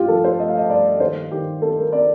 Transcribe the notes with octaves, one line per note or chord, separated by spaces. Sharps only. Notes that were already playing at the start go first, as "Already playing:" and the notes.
Already playing: G2 A3 F4 G4
F3 A4
C5
A3 D#5
F5
D#5
G2 D5
D#2 C5
D#3 G4
C4 A4
A#4
C4 D5